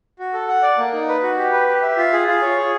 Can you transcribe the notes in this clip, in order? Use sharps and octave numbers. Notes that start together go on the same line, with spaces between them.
F#4
A4
F#5
D5
A#3
D#4
B4
F#4
G4
B4
G4
E5
F4
G#4
F4
C#5
G#4